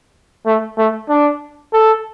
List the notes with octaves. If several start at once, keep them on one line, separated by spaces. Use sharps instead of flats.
A3
A3
D4
A4